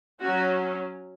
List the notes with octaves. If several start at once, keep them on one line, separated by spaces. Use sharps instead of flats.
F#3 C#4 F#4